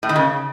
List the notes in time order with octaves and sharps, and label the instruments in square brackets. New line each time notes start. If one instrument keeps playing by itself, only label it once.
[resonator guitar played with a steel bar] A2
D#3
C#3